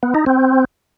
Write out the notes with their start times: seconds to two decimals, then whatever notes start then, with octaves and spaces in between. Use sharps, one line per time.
0.03 B3
0.15 D#4
0.26 C4